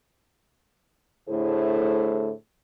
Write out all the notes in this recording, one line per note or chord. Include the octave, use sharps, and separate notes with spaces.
A2 D3 A3 E4 G#4 C5